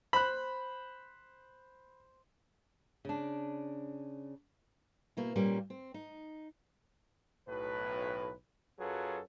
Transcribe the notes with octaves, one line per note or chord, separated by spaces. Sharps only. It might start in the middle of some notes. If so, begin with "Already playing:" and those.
C5 B5 F#6
C#3 D4
B2 A#3 E4
A#2 G3 A#3 C#4
C4
D#4
B1 A2 B4
F#2 F#3 F4 G#4 A4 B4